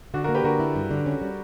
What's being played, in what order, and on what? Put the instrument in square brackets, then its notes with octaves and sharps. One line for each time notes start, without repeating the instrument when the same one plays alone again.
[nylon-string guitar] D3 [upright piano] D4 F#4
[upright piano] F#4 A#4
[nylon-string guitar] A#3
[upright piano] G4 B4
[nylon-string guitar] D3 [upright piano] F#4 A#4
[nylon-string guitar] E4
G2
D3
C#4
G3